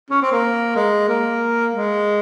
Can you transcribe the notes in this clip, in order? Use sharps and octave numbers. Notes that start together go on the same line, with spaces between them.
C#4
C4
A#3
G#3
A#3
G#3